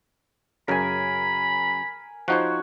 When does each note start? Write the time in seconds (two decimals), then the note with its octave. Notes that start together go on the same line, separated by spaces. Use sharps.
0.68 F#2 C#3 A#4 G#5 B5
2.28 F3 D#4 F#4 C5 C#5